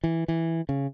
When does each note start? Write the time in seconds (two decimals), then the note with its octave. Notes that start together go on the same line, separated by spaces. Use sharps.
0.04 E3
0.28 E3
0.69 C#3